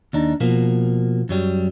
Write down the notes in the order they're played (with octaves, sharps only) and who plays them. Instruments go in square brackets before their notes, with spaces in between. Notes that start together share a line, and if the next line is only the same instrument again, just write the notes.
[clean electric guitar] D#2 D4 D#4
B2 F3 A#3
F#2 F#3 G3